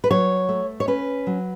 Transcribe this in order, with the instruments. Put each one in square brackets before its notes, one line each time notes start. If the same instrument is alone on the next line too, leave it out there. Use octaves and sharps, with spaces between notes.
[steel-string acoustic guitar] B4
F#3 C#5
A3
C#5
C#4 B4
F#3